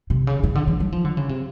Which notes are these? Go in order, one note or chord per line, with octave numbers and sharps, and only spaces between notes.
C3
C#3
C#3
D3
E3
F#3
F3
D3
C#3
C3